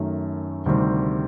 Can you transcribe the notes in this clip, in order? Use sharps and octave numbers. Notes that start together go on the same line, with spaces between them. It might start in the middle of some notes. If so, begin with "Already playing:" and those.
Already playing: F#2 D#3 A3
D2 C3 D#3 G3 C4